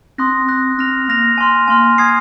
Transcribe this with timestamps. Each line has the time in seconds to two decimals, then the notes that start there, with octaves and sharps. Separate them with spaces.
0.18 C4 C6 D#6 F#6 A#6
0.48 C6 D#6 F#6 A#6
0.78 C4 F6 A#6 F7
1.08 A#3 F6 A#6 F7
1.38 G#5 C6 F6
1.68 A#3 G#5 C6 F6
1.98 G#5 D#6 G#6 C7